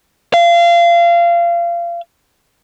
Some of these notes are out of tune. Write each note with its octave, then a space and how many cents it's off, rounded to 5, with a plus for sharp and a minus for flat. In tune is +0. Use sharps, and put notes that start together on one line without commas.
F5 -25